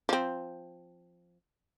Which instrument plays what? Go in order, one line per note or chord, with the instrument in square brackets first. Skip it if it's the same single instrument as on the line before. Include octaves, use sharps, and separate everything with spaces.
[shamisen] F3 C4